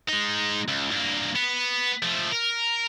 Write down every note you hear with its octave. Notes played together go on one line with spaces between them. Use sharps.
G#3 D#4
C#2
G2 A#3
B3
F3 A3
A#4